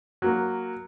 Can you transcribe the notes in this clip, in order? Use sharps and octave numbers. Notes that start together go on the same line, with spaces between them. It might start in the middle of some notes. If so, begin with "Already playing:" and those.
F#3 A#3